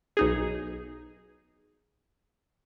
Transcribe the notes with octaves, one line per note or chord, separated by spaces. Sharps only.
B1 D#4 G#4